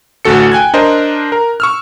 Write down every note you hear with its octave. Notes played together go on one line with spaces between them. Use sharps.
A1 D2 F#4 A4 C#7
G5 G#5 F#6 G#6
D4 A#4 C5 D#5
A#4
C#6 E6 F6